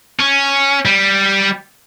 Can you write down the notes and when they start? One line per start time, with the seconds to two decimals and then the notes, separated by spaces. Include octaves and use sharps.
0.20 C#4
0.85 G3